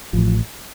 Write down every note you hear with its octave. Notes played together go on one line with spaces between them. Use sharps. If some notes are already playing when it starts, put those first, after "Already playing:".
A1 A2 F3